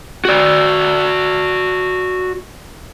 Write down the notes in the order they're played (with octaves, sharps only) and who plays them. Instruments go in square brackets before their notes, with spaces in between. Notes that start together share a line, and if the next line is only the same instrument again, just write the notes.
[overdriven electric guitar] F#4 D5